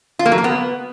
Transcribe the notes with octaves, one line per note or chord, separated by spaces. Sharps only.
F4
A#3
F#3
A#3
B3